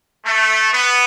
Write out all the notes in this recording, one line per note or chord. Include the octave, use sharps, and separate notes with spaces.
A3
B3